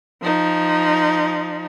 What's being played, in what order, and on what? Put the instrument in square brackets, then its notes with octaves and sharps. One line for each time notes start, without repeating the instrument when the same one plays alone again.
[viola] F3 D#4